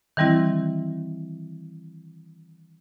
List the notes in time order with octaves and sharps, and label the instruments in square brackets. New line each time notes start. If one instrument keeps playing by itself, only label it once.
[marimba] D#3 E3 G3 C4 E4